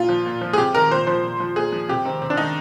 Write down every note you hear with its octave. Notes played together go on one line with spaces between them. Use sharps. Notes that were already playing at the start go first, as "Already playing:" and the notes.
Already playing: A#2 F4
F3
A#2
F3
G#4
C3 G4
D#3 A#4
A#2 C5
F3 C5
A#2
F3
A#2 G#4
F3
C3 G4
D#3 C4
C3 C4
D4
D#3 D#4